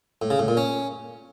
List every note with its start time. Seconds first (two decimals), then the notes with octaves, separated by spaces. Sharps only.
0.22 A2
0.30 C#3
0.39 A2
0.48 A#2
0.57 C#4